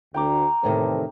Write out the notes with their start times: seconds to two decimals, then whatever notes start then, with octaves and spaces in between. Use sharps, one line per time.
0.14 D2 G5 A#5 D6
0.63 E2 A2 C3 D#3 C4 A4